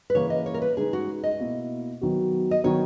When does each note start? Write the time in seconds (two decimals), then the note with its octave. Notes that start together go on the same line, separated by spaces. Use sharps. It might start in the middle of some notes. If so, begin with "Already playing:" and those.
0.10 B4
0.15 C#3 E3 A#3 C#5
0.30 D#5
0.46 C#5
0.54 A#4
0.62 B4
0.77 C#3 G#3 D#4 G#4
0.93 F#4
1.24 D#5
1.40 B2 A#3 E4
2.01 D#3 F#3 B3 F#4
2.51 D#5
2.64 D#3 F#3 B3 D#4 C#5